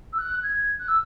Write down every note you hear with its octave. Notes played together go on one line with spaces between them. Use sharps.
E6
F#6
G#6
F#6
E6